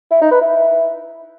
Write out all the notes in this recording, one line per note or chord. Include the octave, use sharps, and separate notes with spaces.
E4
D#4
B4
E4